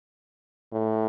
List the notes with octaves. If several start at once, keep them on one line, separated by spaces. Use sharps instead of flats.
A2